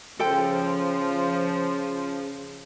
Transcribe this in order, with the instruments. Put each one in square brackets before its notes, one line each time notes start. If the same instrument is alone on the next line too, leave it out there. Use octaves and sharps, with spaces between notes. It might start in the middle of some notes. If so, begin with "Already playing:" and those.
[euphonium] C#3 [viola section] F3 [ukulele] A4 G5